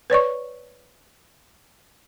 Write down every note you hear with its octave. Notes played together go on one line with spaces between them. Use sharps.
B4 C#5 D5 C#6